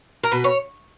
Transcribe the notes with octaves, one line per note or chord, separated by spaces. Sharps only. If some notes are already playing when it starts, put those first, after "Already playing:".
A#4
B2 B4
C#5